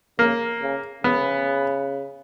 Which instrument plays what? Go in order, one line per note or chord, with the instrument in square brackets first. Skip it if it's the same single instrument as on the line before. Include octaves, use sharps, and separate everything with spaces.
[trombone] C#3 [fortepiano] A#3
[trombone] C#3
[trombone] C#3 [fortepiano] B3